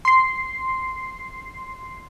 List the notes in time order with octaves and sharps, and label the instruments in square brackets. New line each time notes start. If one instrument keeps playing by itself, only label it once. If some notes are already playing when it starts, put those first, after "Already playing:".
[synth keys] C6 C7